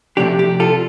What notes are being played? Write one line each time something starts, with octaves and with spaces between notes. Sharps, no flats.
C3 F3 A3 D4 G4
G4
F4 A4